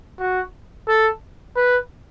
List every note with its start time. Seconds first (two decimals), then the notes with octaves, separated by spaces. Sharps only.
0.20 F#4
0.88 A4
1.56 B4